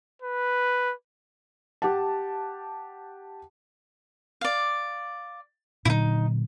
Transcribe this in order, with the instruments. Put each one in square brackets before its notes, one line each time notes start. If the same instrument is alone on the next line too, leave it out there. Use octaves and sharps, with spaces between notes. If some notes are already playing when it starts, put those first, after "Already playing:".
[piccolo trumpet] B4
[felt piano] G4 F#5 A5
[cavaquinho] D5 F5
[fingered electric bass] A#2 D3 F#3 [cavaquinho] D#4 E4